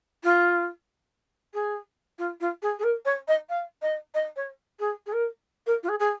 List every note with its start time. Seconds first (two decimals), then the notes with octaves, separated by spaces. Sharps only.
0.24 F4
1.54 G#4
2.19 F4
2.41 F4
2.62 G#4
2.79 G#4
2.84 A#4
3.05 C#5
3.28 D#5
3.49 F5
3.82 D#5
4.15 D#5
4.36 C#5
4.80 G#4
5.06 G#4
5.13 A#4
5.67 A#4
5.83 F4
5.89 G#4
6.00 G#4